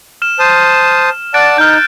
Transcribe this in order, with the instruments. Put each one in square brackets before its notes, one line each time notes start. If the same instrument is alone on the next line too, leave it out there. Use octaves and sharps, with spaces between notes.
[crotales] F6 E7
[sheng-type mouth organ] C5 A5 D#6
[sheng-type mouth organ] D5 F#5 A5 [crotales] F#6 A6 D7
[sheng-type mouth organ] D#4 [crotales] F6 G6